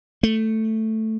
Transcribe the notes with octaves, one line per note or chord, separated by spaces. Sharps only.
A3